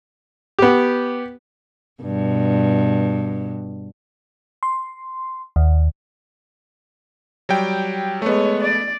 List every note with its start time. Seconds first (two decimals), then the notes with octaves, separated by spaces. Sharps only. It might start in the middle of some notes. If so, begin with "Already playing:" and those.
0.59 B3 G4
2.02 G2 B2
4.63 C6
5.56 D#2
7.49 F#3 G3 G5
8.22 G#3 A3 B3 C#5
8.62 D5